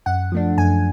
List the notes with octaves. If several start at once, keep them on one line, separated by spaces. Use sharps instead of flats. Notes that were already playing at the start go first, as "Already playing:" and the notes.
F#2 F#5
F3 A3 D4
F#2 G#5